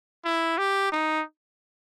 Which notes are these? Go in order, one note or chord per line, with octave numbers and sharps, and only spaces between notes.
E4
G4
D#4